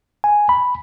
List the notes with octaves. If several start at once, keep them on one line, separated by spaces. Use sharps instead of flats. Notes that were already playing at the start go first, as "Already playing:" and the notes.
G#5
B5